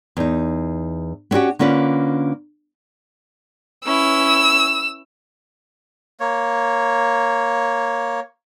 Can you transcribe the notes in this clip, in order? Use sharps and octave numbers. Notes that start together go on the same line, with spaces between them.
E2 D#4
B3 C#4 D4 F#4 G4
D3 A#3 C#4 F4 B4
C#4 E4 B4 E6
A#3 C#5